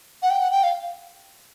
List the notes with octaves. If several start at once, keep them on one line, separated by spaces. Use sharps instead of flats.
F#5
G5
F#5
G5
F5